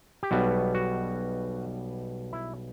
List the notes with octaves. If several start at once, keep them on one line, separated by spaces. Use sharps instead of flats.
G4
B1 B2 G3 B3 F#4
F#4
E4